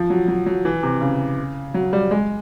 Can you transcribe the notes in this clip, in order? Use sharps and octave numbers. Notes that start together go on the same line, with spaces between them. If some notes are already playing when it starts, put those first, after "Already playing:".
Already playing: F3
F#3
F#3
F#3
E3
C3
C#3
F#3
G3
G#3